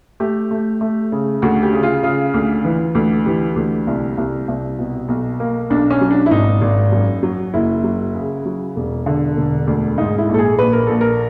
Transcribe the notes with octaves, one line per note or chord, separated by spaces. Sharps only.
A3 G4
A3
A3
C#3
D2 F#4
G4
C#3
F4
C#3 F4
D2
E3
D2
E3 G4
D2
C2
C2
C2
B2
B1
A#3
B1 D4
C#4
F#3
D4
E4
G#1 D#4
G#1
F#2
F#3
F#1 E4
F#3
C#3
F#3
E1
D3
E1
D2
G#2 D#4
E4
A#1
A4
G#4
A#1 B4
A#4
A#1 A4
A#4